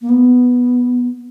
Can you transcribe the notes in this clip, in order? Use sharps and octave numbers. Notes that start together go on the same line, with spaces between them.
A#3
B3